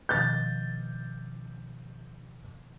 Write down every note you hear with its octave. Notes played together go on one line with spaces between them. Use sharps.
B2 D#3 F3 G6 A6